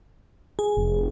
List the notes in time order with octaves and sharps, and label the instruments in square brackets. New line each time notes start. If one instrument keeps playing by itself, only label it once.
[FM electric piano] G#4
[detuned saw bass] F1